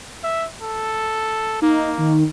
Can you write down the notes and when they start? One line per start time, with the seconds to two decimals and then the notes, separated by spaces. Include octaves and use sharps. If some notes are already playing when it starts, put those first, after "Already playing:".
0.23 E5
0.61 A4
1.62 A#3 D#4
1.98 D#3